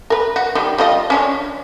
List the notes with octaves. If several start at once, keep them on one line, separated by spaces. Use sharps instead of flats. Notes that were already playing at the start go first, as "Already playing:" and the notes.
A#4 B4
F#4
D#3 G3
G3 F4 D#5
C#4 D4 C#5